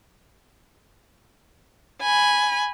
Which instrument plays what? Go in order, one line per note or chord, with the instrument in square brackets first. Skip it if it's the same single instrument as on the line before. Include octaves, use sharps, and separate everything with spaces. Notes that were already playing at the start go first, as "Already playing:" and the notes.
[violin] G#5 B5